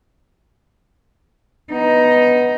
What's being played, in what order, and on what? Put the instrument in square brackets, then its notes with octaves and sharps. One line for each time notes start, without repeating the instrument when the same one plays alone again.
[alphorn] B3 [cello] D#4